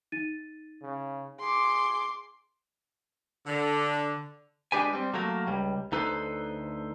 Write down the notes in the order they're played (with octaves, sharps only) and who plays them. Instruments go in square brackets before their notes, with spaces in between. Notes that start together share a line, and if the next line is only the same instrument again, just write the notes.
[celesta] D#4 A6 D#7
[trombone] C#3
[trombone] G#4 [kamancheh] C6 D6
[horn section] D3
[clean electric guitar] G#3 D4 G4 B4 G#5
G3 C4
F#3 A3 A#3 A#4
C#2 G3
D2 D#4 A4 B4 C5